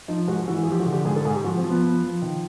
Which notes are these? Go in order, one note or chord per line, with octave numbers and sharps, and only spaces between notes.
F3 D#4
G#2 F#4
E3 F#4
G#4
F3
G4
F#4
D3
G4
G#2 G#4
A4
G#2 G#4
G4
F3 F#4
C4
F3
B3
F3
F3
D#3